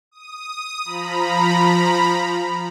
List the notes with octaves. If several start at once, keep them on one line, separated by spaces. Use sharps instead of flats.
D#6
F3 A#5 B5